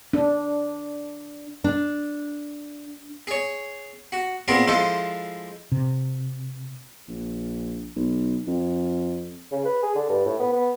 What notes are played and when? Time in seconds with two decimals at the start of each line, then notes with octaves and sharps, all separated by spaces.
0.13 D4
1.64 D4
3.27 G#4 C#5
4.12 F#4
4.48 A#2 B3 C4 G#4 A#4
4.68 F3 G#3 E4 A4 C5
5.72 C3
7.08 A#1
7.96 B1
8.47 F2
9.52 C#3
9.65 B4
9.83 G#4
9.95 D3
10.09 G2
10.26 A2
10.40 B3
10.52 B3